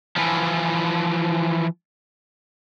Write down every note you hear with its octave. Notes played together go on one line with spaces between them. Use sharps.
E3 F3